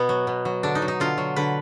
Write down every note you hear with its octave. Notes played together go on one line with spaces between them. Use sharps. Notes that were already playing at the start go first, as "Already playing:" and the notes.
Already playing: B2 B3
F#3
B2
F#3
D3 D4
D#4
F#3
D#4
D3 F4
F#3
D3 B4